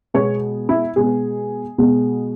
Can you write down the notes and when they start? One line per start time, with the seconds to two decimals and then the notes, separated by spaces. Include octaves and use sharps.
0.14 B2 G#3 B3 C#5
0.69 E4
0.96 B2 G#3 B3 G#4
1.78 B2 G#3 B3